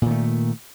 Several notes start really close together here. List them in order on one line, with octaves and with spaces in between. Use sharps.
A#2 D#3 A3